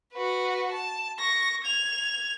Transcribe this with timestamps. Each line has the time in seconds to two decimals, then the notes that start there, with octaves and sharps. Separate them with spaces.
0.13 F#4 B4
0.71 A5
1.19 C#6 A#6
1.64 G#6 F7